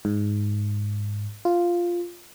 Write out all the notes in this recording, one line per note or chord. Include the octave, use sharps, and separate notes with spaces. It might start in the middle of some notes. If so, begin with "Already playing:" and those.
G#2
F4